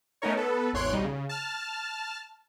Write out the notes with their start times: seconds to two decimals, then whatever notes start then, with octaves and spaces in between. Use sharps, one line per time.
0.22 A3 B3 C#4 D#4 A#4 C#5
0.36 B3 A4 B4
0.73 G#1 E2 C#5 C6 F#6 D7
0.93 B1 G3 D#4
1.04 C#3
1.29 A5 F6